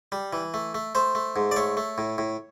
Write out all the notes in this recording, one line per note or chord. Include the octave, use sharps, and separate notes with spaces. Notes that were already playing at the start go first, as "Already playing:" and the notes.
G3
E3
A3
A3
A3 C5
A3
G#2
D5
A3 C#5
A3
A2
A2